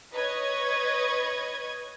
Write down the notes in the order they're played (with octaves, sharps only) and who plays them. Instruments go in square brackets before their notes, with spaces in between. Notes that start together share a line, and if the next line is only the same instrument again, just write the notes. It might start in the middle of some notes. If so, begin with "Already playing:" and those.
[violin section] B4 C#5 D#5 G#6